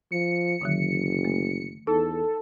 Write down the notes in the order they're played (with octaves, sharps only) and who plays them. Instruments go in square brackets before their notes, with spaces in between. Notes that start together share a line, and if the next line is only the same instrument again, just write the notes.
[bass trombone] F3 [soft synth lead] C#7
[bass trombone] F#1 [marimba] D3 D#3 F#3
[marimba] A3
[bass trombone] E2 [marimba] D#4 [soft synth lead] A4